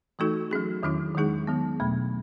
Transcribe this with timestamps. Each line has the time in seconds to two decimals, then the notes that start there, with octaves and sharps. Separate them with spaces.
0.19 E3 A3 D#4 F#4 A4
0.51 F#3 C#4 G#4
0.83 E2 D#3 F#3 C#4 E4
1.15 D#3 G#3 D#4 G#4
1.47 D#3 F#3 B3
1.79 E2 B2 F#3 A3